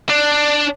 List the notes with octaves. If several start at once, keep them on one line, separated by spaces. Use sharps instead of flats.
D4